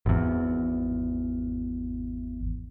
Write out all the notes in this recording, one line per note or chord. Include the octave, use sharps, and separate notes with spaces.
G#1 E2